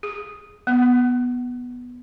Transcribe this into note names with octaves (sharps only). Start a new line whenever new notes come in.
G#4
B3